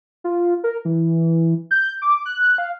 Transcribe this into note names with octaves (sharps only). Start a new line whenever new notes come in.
F4
A#4
E3
G6
D6
F#6
F5